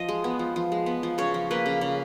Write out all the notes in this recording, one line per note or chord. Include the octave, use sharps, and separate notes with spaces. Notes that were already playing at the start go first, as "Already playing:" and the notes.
Already playing: F3 D#5
G#3
B3
F3
F3
G#3
B3
F3
C#3 C#5
F3
A#3 B4
C#3
C#3